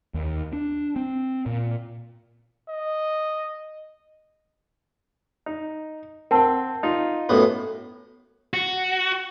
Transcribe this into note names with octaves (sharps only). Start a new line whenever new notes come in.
D#2
D4
C4
A#2
D#5
D#4
C4 A#4 F#5 G5 A5
D#4 F4
F#2 A2 B3
F#4